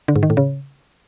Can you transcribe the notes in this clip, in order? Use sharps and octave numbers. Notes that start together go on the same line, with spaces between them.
D3
G#2
D#3
A2
C#3